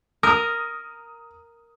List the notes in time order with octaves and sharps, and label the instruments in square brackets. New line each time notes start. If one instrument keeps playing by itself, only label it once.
[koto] A#4 [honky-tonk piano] D#6